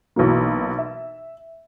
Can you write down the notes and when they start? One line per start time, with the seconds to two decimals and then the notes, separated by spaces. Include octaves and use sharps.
0.16 B1 E3 F#3 A#3
0.78 E5